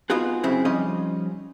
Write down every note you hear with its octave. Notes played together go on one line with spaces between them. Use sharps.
B3 D#4 F4 F#4 G#4
F#2 C#3 C4 E4
F3 G3 C#4 D#4 D#5